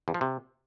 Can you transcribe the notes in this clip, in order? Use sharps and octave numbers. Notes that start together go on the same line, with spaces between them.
E2
F3
C3